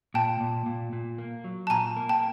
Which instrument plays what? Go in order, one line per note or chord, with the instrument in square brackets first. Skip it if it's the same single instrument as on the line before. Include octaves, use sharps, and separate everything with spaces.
[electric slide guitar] A#2 [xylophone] G5 A5
[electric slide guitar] A#2
A#2
A#2
A#3
F#3
[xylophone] A5
[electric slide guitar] A#2 [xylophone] G#5 A#5
[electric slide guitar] A#3
[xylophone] G5 A5